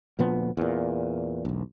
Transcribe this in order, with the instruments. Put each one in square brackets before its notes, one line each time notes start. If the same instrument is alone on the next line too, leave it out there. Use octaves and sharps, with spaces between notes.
[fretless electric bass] D2 A#2 F3 B3
E2 A#2
E1 B1